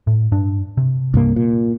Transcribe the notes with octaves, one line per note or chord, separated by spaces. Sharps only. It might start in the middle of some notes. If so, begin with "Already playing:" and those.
A2
G2 D4
C3
C2 G2 A#3
A#2